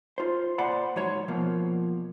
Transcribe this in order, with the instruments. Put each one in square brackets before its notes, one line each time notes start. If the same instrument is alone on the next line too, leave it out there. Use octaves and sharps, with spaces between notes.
[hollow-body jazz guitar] F4 C5
A#2 C5 D5 F#5 B5
G#2 F#3 C#5 C6
B2 F3 A#3